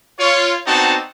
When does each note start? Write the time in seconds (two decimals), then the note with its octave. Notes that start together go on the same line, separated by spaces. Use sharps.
0.19 F4 C#5
0.66 B3 C4 D4 D#4 F#4 A5